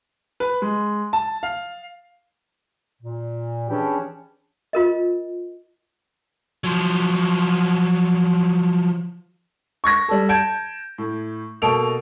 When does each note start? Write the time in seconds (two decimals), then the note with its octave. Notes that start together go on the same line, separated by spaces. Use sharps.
0.40 B4
0.62 G#3
1.13 A5
1.43 F5
3.02 A#2
3.69 E3 C#4 D4 G4 G#4
4.73 F4 A#4 D#5
6.64 F3 F#3
9.84 C#6 G#6 A#6
10.08 G3 A4
10.29 A5 G6 G#6 D7
10.98 A2
11.62 B2 A#3 A4 D7 F7